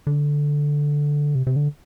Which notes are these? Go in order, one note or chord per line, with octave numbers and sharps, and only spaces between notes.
D3
C3
C3
D3